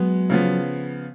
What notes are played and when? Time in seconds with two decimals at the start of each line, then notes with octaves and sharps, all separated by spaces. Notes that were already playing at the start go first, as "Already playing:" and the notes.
Already playing: F#3 G#3 B3
0.30 C#3 F3 B3